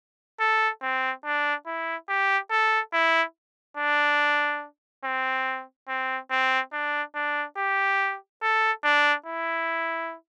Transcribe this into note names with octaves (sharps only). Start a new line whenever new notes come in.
A4
C4
D4
E4
G4
A4
E4
D4
C4
C4
C4
D4
D4
G4
A4
D4
E4